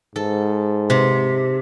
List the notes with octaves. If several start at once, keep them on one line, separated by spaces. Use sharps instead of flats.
G#2 A4
C3